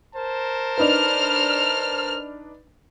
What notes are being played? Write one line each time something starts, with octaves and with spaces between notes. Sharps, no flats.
A#4 C5 A5
D4 D#4 B4 F6